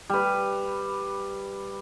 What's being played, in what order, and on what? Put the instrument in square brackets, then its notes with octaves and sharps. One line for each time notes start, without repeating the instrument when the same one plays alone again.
[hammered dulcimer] G3 B4